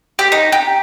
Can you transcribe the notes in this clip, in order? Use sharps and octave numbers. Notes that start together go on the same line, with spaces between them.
G4
D#4
G4